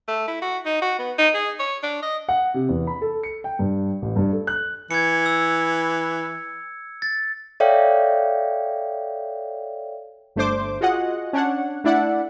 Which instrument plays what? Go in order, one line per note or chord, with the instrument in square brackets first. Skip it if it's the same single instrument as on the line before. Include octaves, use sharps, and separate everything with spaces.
[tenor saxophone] A3
E4
F#4
D#4
F#4
B3
D#4
G#4
C#5
D4
D#5
[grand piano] F#5
C3
E2
B5
A4
C#7
G5
G2
A1
G2
A4
F#6
[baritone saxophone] E3 [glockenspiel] G#6 C#7
[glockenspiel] E6
A6
[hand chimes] A4 C#5 D5 E5 F5 G5
[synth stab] G1 A3 D4 C5 D6
F4 F#4 G#4 D#5 F#5
C#4 D4 C#5 F#5
A3 D4 E4 D5 E5 F#5